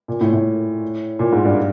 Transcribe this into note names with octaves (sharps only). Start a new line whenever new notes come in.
A#2
A2
A2
A#2
G#2
G2